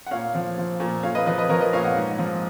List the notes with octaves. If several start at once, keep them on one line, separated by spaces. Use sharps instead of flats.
F#5
A#2 C#5 F5
F3
F3
A#2
A#2 C#5 F5
B4 D#5
F3 B4 D#5
B4 D#5
F3 A#4 C#5
B4 D#5
A#2 C#5 F5
D#5 F#5
G#2
F3